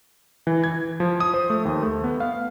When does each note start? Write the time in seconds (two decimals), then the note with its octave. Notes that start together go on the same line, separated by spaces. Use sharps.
0.47 E3
0.64 G#6
1.00 F3
1.20 D#6
1.34 C5
1.50 A3
1.65 D#2
1.83 A3
2.04 B3
2.20 F5